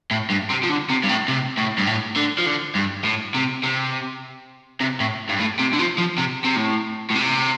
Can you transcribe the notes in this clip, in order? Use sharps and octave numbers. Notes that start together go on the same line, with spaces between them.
A2
G2
C3
F3
D3
C3
G2
A2
C3
A2
G2
A2
D3
F3
D3
G2
A2
C3
C3
C3
A2
G2
A2
C3
D3
F3
F3
C3
C3
A2
A2
C3